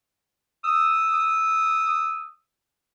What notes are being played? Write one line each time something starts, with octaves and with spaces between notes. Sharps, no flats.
D#6 E6